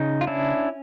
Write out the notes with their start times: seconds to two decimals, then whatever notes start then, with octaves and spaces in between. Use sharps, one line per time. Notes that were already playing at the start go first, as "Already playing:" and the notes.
Already playing: C#3 D#4
0.21 F4
0.27 C#4 D4 E4